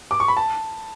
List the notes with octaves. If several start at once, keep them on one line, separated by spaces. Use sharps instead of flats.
D6
C#6
B5
A5